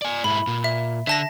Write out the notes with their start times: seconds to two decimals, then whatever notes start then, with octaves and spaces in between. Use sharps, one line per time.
0.02 D5 G#5
0.24 G#2 E4 B5
0.47 A#2
0.64 E5
1.07 D3 E5 A5 A#6